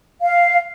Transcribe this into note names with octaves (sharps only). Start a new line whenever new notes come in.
F5